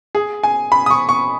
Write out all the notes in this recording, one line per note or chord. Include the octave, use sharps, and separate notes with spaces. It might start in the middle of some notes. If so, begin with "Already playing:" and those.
G#4
G#5
B5
D#6
C#6
C#6